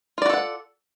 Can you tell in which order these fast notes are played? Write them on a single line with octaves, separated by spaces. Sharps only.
F4 D5 F#4 A4 F#5